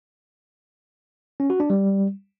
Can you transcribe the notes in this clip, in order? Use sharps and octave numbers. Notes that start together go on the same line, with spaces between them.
C#4
F#4
D4
G3